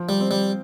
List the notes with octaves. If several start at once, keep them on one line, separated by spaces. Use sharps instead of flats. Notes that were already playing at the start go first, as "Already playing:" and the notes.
Already playing: F3
G3
C4
G3